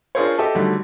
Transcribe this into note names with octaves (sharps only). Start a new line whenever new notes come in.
D4 F4 G#4 A#4 C5 C#5
G4 A4 D#5 E5 A5
D3 D#3 F#3 G3 A3